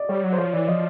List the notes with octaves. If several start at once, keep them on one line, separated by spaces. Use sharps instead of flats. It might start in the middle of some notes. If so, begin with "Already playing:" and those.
Already playing: D5 D#5
G3 C#5
F#3
C5
F3 C#5
E3 D5
F3 D#5